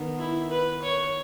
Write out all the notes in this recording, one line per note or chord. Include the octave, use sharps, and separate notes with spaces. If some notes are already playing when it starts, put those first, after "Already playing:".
Already playing: D#3 B3
E4
B4
C#5